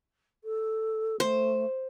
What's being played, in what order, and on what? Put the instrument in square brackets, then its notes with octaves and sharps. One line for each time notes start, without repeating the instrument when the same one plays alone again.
[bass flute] A4
[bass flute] A3 [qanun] C5